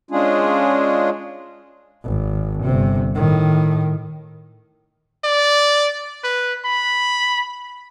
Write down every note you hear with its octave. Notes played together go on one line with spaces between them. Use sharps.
G#3 C#4 D4 F4 G#4
G#1
G1 C3
A2 D#3
D5
B4
B5